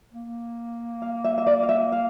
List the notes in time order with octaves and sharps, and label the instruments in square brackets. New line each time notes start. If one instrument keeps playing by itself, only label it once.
[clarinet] A#3
[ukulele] F5
E5
E5
D5
F5
E5
F5